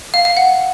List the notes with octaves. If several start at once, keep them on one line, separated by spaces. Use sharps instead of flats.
F5
F5
F#5